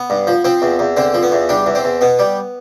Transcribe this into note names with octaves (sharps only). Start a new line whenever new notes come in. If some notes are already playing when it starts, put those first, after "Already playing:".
Already playing: B3
G2
F3
F3 C4
E2
E2
D3 C4
F3
B3
E2
G3 D4
E2
C4
E2
B2 B3
G3